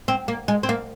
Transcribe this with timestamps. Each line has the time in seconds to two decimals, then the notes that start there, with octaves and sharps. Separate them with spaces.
0.08 C4
0.28 A#3
0.48 G#3
0.63 C4
0.69 A#3